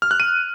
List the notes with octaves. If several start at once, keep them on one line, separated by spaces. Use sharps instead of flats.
F6
F#6
D#7